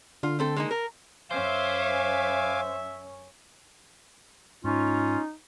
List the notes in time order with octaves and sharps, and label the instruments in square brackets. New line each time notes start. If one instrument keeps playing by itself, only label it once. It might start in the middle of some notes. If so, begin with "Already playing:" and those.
[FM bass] D3 [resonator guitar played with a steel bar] F4
[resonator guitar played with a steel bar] A3 C4 A4
G#3 A#3 D#4
A#4
[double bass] F#2 C#4 [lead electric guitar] C5 [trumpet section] E5 [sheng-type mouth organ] F5 G#5 D6
[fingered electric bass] G#2 [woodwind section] C#4 F4 [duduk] D#4